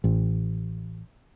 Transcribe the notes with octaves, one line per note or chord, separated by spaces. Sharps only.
A1